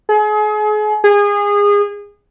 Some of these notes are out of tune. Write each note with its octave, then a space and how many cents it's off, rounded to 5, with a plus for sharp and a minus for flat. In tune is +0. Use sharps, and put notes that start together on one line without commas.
G#4 +35
G#4 -25